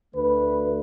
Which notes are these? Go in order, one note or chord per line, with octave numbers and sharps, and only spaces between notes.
D2 D3 A3 B4